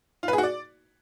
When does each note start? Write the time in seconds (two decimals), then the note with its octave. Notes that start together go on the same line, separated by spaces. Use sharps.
0.23 F4
0.28 B4
0.33 G#4
0.38 F#4
0.43 D5